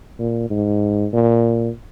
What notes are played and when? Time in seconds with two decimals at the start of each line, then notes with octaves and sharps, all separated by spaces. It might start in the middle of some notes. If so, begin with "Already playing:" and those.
0.18 A#2
0.50 G#2
1.13 A#2